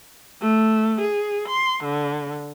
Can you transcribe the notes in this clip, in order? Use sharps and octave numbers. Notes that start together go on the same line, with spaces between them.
A3
G#4
C6
D3